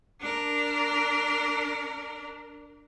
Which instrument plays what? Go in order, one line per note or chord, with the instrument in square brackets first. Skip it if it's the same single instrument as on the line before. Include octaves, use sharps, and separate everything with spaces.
[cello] D4 A#4